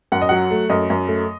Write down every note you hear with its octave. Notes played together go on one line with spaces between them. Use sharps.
F#2 F#5
D#5
F#3 F#5
A3
F#2 D#5
F#2
A3